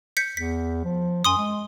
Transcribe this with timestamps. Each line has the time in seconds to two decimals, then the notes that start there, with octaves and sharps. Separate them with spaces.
0.17 G6 B6 C#7
0.37 E2 B6
0.84 F3
1.24 F#2 G#5 C6 D#6
1.37 G#3